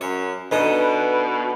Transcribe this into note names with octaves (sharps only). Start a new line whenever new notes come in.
F#2 C#5
B2 D3 D#4 B4 D#6